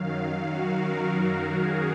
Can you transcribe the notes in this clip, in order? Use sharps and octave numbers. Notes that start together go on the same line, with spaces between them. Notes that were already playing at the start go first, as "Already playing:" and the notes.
Already playing: F#2 D#3 F#3 F5
F#4
A#4
A#4
G#4